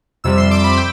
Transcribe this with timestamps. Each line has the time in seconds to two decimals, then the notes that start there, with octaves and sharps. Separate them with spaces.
0.24 F2 C3 G3 E6
0.38 C6
0.51 D6
0.64 B5
0.77 G5